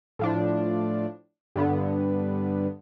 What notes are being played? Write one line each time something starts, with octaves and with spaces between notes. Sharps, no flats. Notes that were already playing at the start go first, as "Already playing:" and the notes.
A2 F3 D4
G2 D3 B3